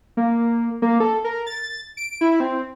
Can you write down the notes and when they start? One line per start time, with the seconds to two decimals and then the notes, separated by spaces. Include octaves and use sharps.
0.17 A#3
0.82 A#3
1.00 A4
1.24 A#4
1.47 A6
1.97 D7
2.21 E4
2.40 C4